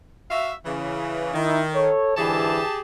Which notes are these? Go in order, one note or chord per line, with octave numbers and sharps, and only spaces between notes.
F#4 E5 F5
C#3 E3
D#3 D#4 E4
A4 C#5
G#2 D3 E3 G4 G#4 A5